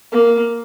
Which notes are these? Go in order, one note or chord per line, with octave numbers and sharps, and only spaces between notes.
A#3